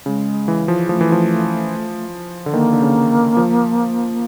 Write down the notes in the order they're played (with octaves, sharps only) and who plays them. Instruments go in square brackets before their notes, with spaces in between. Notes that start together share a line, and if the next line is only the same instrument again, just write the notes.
[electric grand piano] C#3 [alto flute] G#3
[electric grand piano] E3
F3
[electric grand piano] F3 [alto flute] A3
[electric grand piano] E3
F3
D3
[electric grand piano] D#3 [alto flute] A#3
[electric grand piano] D3
C#3
F3